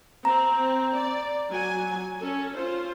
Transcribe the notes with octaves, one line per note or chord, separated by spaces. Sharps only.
C4 A#5
D5
F#3 G#5
C#4 A4
F4 C5